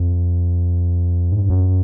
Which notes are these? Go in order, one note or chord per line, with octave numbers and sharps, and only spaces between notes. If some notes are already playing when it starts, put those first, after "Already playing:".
Already playing: F2
G#2
G2
F#2